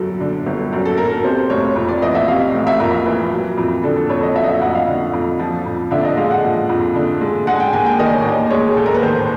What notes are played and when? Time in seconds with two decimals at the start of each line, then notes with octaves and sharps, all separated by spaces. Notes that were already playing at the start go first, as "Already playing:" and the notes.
Already playing: G1 F#2 F#3 A4
0.20 D3
0.46 G1
0.73 F#2
0.86 A4
0.97 F#3 A#4
1.12 A#4
1.24 C3 C5
1.50 F1 C#5
1.76 F2
1.89 D5
2.02 E3 D#5
2.15 E5
2.28 C3 F5
2.54 F1
2.67 E5
2.80 F2 A#4
3.06 E3
3.32 F#3
3.58 F2
3.83 D3 A4
3.97 A4
4.10 F2 C#5
4.23 D#5
4.36 F#3 E5
4.43 D#5
4.49 E5
4.62 F2 F#5
4.75 F5
4.87 D3
5.13 F2
5.39 F3
5.66 F2
5.91 D3 E5
5.99 D5
6.05 D#5
6.17 G#3 F5
6.31 F#5
6.43 F3
6.69 F2
6.95 D3
7.21 G#3
7.47 G#3 F#5
7.56 G#5
7.60 G5
7.73 D#2 G#5
7.86 G5
7.99 D#3 D#5
8.06 D5
8.14 C#5
8.21 D#2 D5
8.50 G#3 C#5
8.69 G#4
8.77 D#2 A4
8.86 A#4
8.94 B4
9.02 D#3 C5